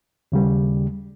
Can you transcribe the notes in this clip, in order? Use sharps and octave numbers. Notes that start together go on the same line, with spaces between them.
D#2 C#3 G3